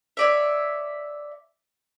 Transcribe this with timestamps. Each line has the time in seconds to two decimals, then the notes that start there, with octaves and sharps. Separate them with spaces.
0.17 C#5 D5 E5